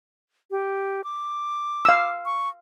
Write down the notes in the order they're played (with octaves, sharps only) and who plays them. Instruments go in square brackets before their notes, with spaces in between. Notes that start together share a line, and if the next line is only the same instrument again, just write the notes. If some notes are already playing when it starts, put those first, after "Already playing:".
[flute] G4
D6
[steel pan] F5 E6
[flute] C#6